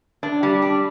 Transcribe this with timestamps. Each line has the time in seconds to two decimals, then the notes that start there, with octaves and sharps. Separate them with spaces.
0.23 D4
0.43 G3
0.62 D4